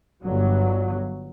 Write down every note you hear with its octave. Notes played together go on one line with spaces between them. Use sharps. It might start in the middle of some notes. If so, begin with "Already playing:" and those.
G1 G2 F#3